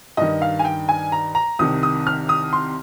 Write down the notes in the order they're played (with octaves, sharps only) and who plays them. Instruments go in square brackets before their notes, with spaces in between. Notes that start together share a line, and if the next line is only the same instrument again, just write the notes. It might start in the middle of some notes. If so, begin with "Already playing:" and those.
[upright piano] G2 D#3 D#5
F5
G#5
G5
G#5
A#5
A#5
C2 C3 D#3 D#6
D#6
F6
D#6
C6